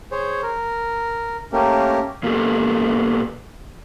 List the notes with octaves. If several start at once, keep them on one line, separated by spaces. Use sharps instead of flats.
G#4 C5 C#5
A#4
A3 A#3 C#4 G4 A#4
A#2 A#3 B3 F#4 G4 A4